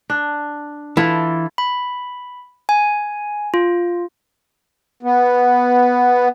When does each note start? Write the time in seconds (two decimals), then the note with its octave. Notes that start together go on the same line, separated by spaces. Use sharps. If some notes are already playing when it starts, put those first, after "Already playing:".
0.10 D4
0.97 E3 E4 F4 A4
1.58 B5
2.69 G#5
3.54 F4
5.03 B3